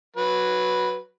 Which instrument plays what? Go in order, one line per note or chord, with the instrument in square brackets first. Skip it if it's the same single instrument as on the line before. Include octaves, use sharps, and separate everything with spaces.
[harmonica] F#3 B4